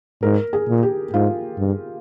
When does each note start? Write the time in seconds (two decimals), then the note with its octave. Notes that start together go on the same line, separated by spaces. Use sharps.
0.23 G#2 A#4
0.53 G#4
0.68 A#2
0.83 G4
1.13 G#2 F4
1.58 G2